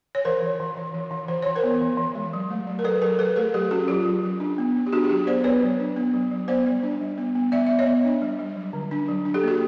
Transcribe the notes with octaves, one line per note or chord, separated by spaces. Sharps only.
C#5
E3 A#4 C5
E3
E3
E3
E3
E3
E3 C5
E3 C#5
A#4 C5
B3
E3
E3
G#3
F#3
A3
F#3
A#4
F#3 A4 B4
F#3 G#4 A#4
F#3 A4 B4
A3 G#4 A#4
F#3 G4 A4
C#4 F#4 G#4
F#3 F4 G4
F#3
F#3
D4
B3
B3
G4
D4 F#4 G#4
G4
F#3 F#4 G#4
B3 C5 D5
B3 B4 C#5
F#3
D4
B3
F#3
F#3
B3 C5 D5
G3
D4
G3
B3
B3
B3 D5 E5
B3 E5
C#5 D#5
B3
D4
G3
G3
F#3
D3
D4
F#3
D4
G4 A4
A#3 F#4 G#4